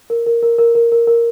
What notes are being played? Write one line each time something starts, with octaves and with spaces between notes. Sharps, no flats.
A#4
A#4
A#4
A#4
A#4
A#4
A#4